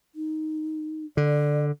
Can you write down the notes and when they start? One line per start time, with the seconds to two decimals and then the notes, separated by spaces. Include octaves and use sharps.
0.15 D#4
1.17 D3 D5